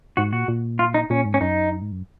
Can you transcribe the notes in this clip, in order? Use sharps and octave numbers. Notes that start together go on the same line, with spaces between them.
G#2 F#4
A#2 F#4
A#2
F4
D#4
A#2 C#4
G#2
C#4
F#2 D#4
G#2
F#2